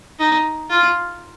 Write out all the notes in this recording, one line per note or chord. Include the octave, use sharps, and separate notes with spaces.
D#4
F4